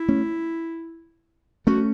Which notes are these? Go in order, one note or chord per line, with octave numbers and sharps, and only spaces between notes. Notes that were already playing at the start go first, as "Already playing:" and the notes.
Already playing: E4
A3 C#4
A3 C#4 F#4